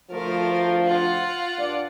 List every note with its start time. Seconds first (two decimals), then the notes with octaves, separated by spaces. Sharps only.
0.11 D2 F3 A3 A#4
0.84 F4 F#5
1.58 G2 D5